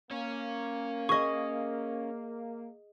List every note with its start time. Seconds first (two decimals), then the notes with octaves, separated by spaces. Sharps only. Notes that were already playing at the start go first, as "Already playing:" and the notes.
0.11 A#3 C#4 C#5
1.09 G#4 D#5 C#6